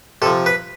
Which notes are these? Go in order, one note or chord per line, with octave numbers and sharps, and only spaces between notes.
C3 F3 A4
B4